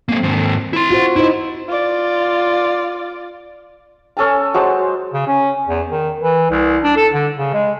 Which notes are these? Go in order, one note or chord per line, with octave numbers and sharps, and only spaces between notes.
G#3 A#3 C4
D#2 G#2
E4 C6
F4 F#4 C5
D#4 E4 C5
F4 D5
C#4 A4 G#5 A5
F#3 G#3 C5 A5
C#3
C#4
E2
D#3
E3
C2
D4
A4
D3
C#3
G#3